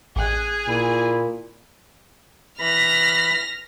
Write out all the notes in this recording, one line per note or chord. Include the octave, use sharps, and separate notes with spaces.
A1 G#4 G#5 F#6
A#2 E4
E3 B5 F6 A#6 B6